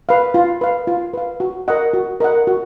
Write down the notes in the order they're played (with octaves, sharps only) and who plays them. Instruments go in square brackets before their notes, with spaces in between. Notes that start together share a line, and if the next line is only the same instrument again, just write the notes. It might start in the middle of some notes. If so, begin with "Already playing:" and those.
[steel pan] B4 F5
F4
B4 F5
F4
B4 F5
F#4
A#4 D#5 F#5
F#4
A#4 D#5 F#5
F#4